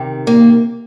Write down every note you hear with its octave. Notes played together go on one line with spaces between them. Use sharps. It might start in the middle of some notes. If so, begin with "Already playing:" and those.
Already playing: C3 D#3
A#3